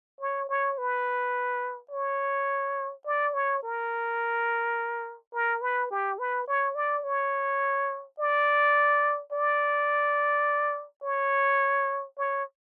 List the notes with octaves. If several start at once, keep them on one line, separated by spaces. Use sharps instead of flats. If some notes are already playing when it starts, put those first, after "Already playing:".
C#5
C#5
B4
C#5
D5
C#5
A#4
A#4
B4
G4
B4
C#5
D5
C#5
D5
D5
C#5
C#5